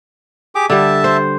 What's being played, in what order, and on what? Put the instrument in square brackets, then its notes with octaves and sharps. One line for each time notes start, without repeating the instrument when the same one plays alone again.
[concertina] G4 G#4 D6
[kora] D3 G3 [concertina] E5 A5
[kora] C5